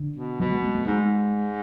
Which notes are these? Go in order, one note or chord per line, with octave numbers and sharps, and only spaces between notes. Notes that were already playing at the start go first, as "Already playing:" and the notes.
Already playing: D3
B2
B2 F#3
G#3
B3
A3
G#2 G#3